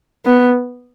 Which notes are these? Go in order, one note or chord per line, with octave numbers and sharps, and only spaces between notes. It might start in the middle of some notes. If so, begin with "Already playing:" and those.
B3